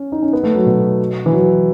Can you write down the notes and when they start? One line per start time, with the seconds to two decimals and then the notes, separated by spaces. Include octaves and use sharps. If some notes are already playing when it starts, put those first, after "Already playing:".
Already playing: C#4
0.12 D#4
0.22 C#4
0.33 B3
0.43 A3
0.55 F#3
0.66 B2
1.26 E3
1.32 F#3